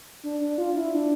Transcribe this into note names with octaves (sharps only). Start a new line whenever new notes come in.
D4
D4
F4
E4
D4